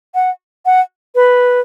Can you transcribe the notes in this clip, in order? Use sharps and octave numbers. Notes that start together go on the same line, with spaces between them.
F#5
F#5
B4